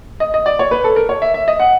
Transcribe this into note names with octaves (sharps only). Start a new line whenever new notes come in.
D#5
D#5
D5
C#5
B4
A4
A#4
C#5
E5
E5
D#5
F#5